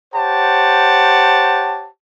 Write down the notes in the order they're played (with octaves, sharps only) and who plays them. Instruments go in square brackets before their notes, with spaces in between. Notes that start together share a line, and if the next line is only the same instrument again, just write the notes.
[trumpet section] G4 C5 C#5 F#5 A5